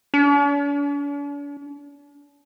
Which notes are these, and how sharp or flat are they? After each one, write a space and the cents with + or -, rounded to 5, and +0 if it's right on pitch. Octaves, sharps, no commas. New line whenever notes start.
D4 -45